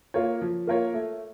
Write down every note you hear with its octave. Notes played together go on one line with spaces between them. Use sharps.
A#3 F4 A#4 C#5
F3
A#3 F4 A#4 C#5
A3